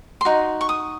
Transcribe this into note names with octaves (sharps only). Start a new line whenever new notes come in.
C6
D#4 F#4
C#6
D#6